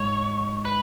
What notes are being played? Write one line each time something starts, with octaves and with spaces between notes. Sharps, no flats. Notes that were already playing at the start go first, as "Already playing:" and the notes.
Already playing: G#2 C#5
B4